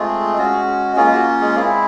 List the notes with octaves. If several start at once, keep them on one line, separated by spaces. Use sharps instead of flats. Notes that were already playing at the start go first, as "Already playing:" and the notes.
Already playing: G#3 A3 C4 F4 G#4
G#3 C#4 F#4
G#3 A#3 C#4 F4 G#4
F#4
G#3 G#4
G#3 C4 E4 G#4